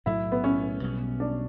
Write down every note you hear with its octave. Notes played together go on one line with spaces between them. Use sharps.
B1 A2 F#3 A3 E4
B3
C#4
B1 B2 G3 B3
D4